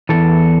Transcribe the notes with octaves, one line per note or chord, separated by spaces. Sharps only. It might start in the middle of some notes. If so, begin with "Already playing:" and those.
E2 C#3 E3 A4